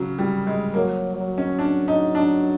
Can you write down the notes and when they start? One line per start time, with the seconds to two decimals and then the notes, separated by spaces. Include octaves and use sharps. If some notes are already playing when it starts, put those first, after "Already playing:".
Already playing: C#3 F#3
0.19 G3
0.47 G#3
0.74 F#3 A#3
1.17 F#3
1.38 C#4
1.59 D4
1.88 D#4
2.15 D4